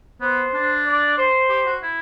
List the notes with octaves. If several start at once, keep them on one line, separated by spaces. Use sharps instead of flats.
B3 C5
D4
D5
C5
G4
F#4
E4